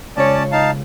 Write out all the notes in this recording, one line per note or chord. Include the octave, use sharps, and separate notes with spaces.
C#2 C#4 C#5 D5 A5
D#4 F5 A5